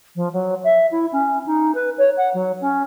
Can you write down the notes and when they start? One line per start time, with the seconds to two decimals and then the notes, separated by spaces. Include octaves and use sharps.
0.15 F3
0.33 F#3
0.64 E5
0.91 E4
1.12 C#4
1.46 D#4
1.74 B4
1.98 C#5
2.17 F#5
2.34 F#3
2.60 C#4